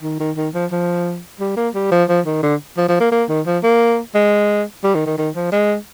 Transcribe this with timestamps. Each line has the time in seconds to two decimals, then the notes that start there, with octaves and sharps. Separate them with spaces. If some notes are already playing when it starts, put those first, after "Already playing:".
0.03 D#3
0.20 D#3
0.37 D#3
0.54 F3
0.72 F3
1.40 G3
1.57 A#3
1.75 G3
1.92 F3
2.09 F3
2.26 D#3
2.43 D3
2.78 F3
2.89 F3
3.01 A#3
3.12 A#3
3.29 D#3
3.46 F3
3.63 A#3
4.15 G#3
4.84 G3
4.95 D#3
5.07 D#3
5.18 D#3
5.35 F3
5.52 G#3